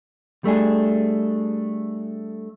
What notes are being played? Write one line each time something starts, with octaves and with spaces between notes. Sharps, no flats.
G3 A3 D4 G#4